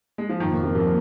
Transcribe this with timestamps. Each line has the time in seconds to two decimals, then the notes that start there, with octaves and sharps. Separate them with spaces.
0.18 G#3
0.29 F3
0.40 F2 D#3 F3 A#3
0.52 D#3
0.63 C3
0.75 C3